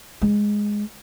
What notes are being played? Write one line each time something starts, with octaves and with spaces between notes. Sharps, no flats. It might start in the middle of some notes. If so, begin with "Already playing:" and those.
G#3